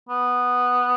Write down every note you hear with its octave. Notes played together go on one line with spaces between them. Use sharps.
B3